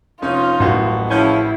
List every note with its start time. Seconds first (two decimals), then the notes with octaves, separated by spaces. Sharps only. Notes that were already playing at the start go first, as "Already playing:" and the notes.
0.22 F1 C#4 D#4 F4
0.60 D#1 A1 F#2 F#4
1.11 C#3 F3 C#4 E4 A5 G6